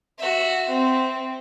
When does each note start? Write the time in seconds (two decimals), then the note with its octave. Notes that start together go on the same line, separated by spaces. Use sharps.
0.18 F#4 E5
0.69 C4